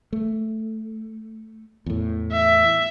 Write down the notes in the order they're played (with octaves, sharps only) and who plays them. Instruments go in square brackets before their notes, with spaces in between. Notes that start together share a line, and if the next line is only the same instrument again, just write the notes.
[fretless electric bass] A3
E2 A2
[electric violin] E5